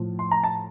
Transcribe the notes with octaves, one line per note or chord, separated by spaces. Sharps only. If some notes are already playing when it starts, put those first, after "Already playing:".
Already playing: A2 F3
C6
A#5
A5